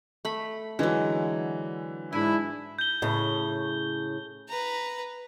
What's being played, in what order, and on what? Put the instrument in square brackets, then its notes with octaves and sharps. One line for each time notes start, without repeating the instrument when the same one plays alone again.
[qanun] A3 B5
[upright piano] D3 E3 [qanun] F#3 G#3
[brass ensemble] G#2 D4 E4 [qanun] G#5
[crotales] G6 G7
[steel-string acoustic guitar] A2 C#3
[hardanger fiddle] B4 A#5